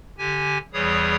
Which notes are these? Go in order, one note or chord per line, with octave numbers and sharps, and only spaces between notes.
D3 G4 G#5
E2 E3 G3 G#4 C#5 D#6